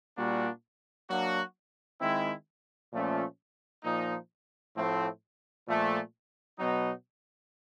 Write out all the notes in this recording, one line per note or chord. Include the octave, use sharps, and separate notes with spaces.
A#2 G3 A#3 D4 F#4
F#3 A#3 D4 F#4
D#3 G#3 C4 E4
A#2 F3 A3 C#4
A#2 F3 A#3 D#4
A2 F3 A3 C4
A#2 F3 A3
B2 F#3 B3 D#4